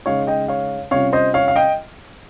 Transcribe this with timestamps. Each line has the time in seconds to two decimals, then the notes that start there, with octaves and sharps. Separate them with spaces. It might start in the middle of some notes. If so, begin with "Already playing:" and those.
0.06 C#3 G#3 D#4 C#5 F5
0.27 D#5 G5
0.48 C#5 F5
0.91 C3 G3 C#4 F4 C#5 F5
1.13 C5 D#5
1.34 C#5 F5
1.48 F5
1.56 D#5 G5